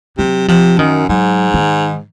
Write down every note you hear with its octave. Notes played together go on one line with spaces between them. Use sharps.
C3 F#3
C3 F3
F#2 D#3
G#2 F#3
D#3